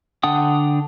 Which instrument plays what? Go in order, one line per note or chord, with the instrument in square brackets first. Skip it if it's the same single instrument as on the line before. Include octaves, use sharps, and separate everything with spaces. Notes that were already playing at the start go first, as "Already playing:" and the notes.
[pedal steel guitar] D3 D4 F#5 G5 D#6